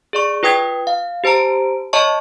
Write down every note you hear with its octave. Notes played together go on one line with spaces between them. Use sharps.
G#4 D5 C#6
F4 B4 G5 D#6 G#6
F5
G4 C5 A5 A#5 D7
C#5 D#5 E5 A5 C#6